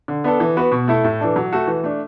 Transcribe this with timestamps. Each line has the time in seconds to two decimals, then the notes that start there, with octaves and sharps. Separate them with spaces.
0.08 D3
0.24 B3 D4 A4
0.40 E3
0.57 B3 F#4 B4
0.72 B2
0.88 A3 E4 A4
1.04 A2
1.20 E3 D4 A4
1.36 F#3
1.52 A3 F#4 A4
1.67 E3
1.84 A3 D4